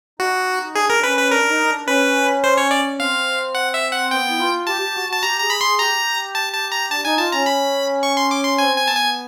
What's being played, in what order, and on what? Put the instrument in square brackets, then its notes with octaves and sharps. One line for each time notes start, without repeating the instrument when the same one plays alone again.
[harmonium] D#4 [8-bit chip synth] F#4
[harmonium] D4 [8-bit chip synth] G#4
[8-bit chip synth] A#4
[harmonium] D4
[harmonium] C#4 [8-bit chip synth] B4
[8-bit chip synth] B4
[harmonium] D4 [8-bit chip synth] A#4
[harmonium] D#4
D4
[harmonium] C#4 [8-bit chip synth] B4
[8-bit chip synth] C5
C#5
D5
[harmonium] C4 [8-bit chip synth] F5
[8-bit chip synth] F#5
E5
F#5
[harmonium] B3 [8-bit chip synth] G5
[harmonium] E4
F4
[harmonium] G4 [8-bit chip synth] A5
[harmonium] G4
F#4
[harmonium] F#4 [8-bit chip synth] A5
[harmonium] G4 [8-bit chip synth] A#5
[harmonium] G#4 [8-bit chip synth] A#5
[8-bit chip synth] B5
[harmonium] G#4 [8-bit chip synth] C6
[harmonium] G4 [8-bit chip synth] A#5
[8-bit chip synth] A5
A5
A#5
[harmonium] D4 [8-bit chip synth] A5
[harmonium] D#4 [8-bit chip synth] G#5
[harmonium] F4 [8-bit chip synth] A5
[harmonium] C#4 [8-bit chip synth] A#5
[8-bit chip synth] B5
C#6
C6
D6
C6
[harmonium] C4 [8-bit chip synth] G#5
[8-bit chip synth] G#5
[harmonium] B3 [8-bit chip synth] A5
[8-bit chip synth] G#5